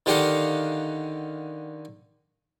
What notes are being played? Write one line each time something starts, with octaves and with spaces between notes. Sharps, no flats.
D3 D#3 G4 A#4 F5 F#5